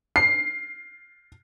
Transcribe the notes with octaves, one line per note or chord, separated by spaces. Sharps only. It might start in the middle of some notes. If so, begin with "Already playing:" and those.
C7